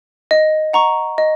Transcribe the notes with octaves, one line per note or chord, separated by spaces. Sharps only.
D#5
F#5 A#5 C#6
D#5